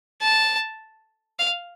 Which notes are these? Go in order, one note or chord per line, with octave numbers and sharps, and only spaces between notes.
A5
F5